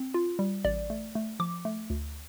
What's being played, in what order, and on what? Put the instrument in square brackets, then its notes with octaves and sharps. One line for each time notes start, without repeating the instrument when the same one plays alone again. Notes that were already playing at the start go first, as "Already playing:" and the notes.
Already playing: [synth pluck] C4
F4
G3
A1 D5
A3
A3
F3 D6
A3
D2